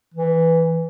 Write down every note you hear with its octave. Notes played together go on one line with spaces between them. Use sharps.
E3